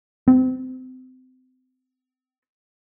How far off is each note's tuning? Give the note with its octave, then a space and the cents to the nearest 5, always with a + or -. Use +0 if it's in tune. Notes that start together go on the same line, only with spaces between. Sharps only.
C4 -30